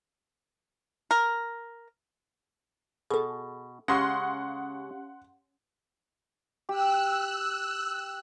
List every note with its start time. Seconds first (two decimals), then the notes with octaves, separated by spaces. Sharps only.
1.11 A#4
3.10 B2 G#4 A4
3.88 C#3 G#3 C#4 G4 F5 F#5 C6
6.69 G4 E6 F#6